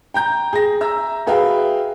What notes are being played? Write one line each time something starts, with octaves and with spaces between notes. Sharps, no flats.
G5 A#5 G6
G#4 A#6
E5 A#5 E6
F#4 G#4 B4 E5 F5 G5